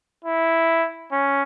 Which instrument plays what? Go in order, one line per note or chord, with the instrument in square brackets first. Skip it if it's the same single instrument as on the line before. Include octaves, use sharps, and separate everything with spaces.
[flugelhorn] E4
C#4